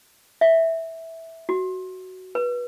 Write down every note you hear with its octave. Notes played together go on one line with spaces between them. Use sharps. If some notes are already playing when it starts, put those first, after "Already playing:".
E5
F#4
B4